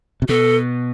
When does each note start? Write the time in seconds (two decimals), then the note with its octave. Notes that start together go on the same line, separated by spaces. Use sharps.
0.22 C3
0.28 B2 A4